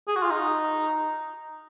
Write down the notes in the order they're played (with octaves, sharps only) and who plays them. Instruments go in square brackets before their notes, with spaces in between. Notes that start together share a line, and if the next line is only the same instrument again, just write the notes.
[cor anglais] G#4
F#4
F4
D#4